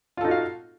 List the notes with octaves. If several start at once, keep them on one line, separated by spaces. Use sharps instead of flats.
D#4 F4 F#4 A4 F5